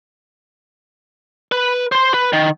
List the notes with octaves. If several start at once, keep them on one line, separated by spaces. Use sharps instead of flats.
B4
C5 C6
B4
D#3